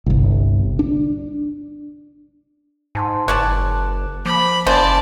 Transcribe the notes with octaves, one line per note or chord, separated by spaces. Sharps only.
G1 C2
D4
G#2 G#5 A5 C6
F#1 C#5 D5 A5 D6 F#6
F3 A#3 B5 D6
F#1 C#3 G#4 C5 D5 D#5 A5